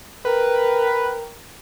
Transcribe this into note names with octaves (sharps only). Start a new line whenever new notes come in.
A#4 B4 G5